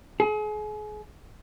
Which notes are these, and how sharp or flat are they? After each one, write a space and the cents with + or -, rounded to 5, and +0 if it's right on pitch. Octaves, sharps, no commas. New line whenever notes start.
G#4 +35